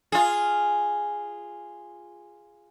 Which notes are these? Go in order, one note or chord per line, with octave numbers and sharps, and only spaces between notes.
F4 G#4